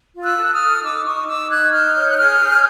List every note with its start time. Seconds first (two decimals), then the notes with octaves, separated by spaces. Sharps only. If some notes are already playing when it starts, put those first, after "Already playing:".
0.15 F4
0.23 E6 F#6
0.38 A4
0.53 D#6 F6
0.60 A4
0.83 D#4 D6 E6
1.05 D#4 C#6 D#6
1.27 D#4 D6 E6
1.50 D#4 F#6 G#6
1.72 D#4 F6 G6
1.95 C#5
2.09 F#6
2.17 G#4 F6 G6
2.40 G#4